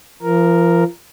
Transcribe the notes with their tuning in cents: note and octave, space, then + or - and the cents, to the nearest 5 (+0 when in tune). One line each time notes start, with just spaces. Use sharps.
F3 -35 A#4 +0